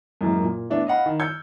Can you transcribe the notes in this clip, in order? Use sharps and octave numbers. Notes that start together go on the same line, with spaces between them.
F#2 A2 E3 G#3 A#3
A#2
E3 A3 B3 D4
D#5 F5 F#5 B5
D#3
E6 G6 G#6 C#7